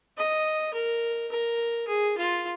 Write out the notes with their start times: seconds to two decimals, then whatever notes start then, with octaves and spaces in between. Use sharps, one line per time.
0.17 D#5
0.73 A#4
1.32 A#4
1.88 G#4
2.17 F4